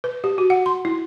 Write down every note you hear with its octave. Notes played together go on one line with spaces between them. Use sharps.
B4
G4
F#4
F#5
C6
E4